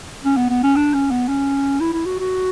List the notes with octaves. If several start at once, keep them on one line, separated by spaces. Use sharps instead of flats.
C#4
B3
B3
C#4
D4
C#4
B3
C#4
E4
E4
F#4
F#4